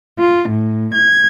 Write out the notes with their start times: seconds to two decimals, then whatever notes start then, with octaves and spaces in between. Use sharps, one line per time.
0.19 F4
0.47 A2
0.94 G#6